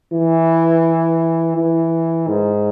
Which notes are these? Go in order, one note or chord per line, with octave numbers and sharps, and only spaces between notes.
E3
E3
G#2